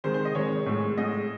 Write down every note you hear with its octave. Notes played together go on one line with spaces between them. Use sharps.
C3 D#3 G#3 C5
C5
D#5
C3 D#3 G#3 C#5
A2 G#3
A2 G#3 D#5